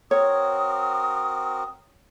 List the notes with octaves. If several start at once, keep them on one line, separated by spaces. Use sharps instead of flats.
C4 F#4 A#4 C#5 D#6